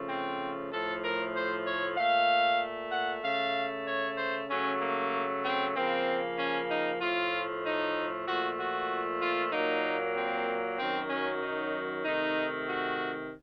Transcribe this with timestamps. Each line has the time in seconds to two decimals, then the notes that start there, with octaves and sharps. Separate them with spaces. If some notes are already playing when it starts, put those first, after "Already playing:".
Already playing: C#3 F3 A3
0.08 C4
0.71 A2 F3 A3 A4
1.03 A#4
1.35 C5
1.66 C#5
1.97 A#2 A3 F5
2.91 F#5
3.23 C#3 A3 F5
3.86 C#5
4.18 C5
4.49 C#3 F#3 A3 C#4
4.81 A#3
5.44 C4
5.76 C#3 F3 A#3 C4
6.38 C#4
6.70 D#4
7.01 A2 F3 A3 F4
7.65 D#4
8.27 A#2 F3 A3 F#4
8.59 F#4
9.21 F4
9.53 A#2 F#3 A#3 D#4
10.16 C4
10.79 F#2 D#3 F#3 C4
11.10 C#4
11.42 D#4
12.05 C3 D#3 A3 D#4
12.68 F#4